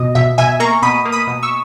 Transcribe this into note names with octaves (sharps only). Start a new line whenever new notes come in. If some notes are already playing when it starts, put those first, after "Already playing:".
Already playing: B2 D#5
B2 E5
B2 E5 G#5
A#3 A#5 C#6
B2 B5 D#6
A#3
B5 D#6
B2
C#6 E6